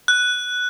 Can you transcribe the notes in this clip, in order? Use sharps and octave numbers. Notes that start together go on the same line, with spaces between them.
F#6